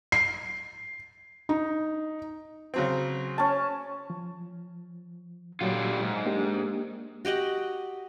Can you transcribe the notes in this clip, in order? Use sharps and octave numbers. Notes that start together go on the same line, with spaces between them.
C7
D#4
C#3 F#3 C4
C#4 A5
F3
A#2 D3 F#3 G3 F4
G#2
A#3 D4 G4
F#4 G4 D#5 F#5